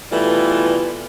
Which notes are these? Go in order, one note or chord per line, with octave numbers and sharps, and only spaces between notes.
B2 E3 G3 A3 F4 B4